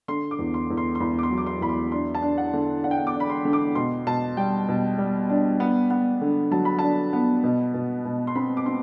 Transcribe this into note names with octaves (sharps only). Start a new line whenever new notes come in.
D3 C6
D6
E2
C6
E2
C6
C6
E2 B5
D6
C6
F#3
D6
C6
E2 B5
C6
D4 C6
A5
D4
F#5
D3
D4 F#5
G5
F#5
D6
D4
B5
C6
D3
D6
B2 C6
B2 A5
G3 G5
B2
G3
D4
B3
B3
D3
F#3 A5
B5
D4 A5
B3
B2
B2
B2
C6
C4 B5
D6
C4 C6